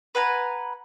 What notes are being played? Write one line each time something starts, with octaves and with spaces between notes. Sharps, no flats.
B4 F#5 G#5 A#5